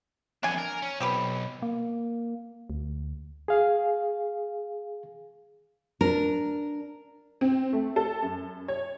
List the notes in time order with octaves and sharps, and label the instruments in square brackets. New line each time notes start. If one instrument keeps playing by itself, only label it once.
[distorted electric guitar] F2 B3 [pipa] D4 G#5
[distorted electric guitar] A#4
C#4
[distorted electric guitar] B1 [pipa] C4 G4 B4
[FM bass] A#3
D2
[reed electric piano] G#4 F5
[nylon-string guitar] D4 A#4
[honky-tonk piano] C4
A3
A4
F#2
C#5